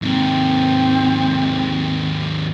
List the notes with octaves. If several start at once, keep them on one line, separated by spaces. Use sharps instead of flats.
D#2 G#2 C4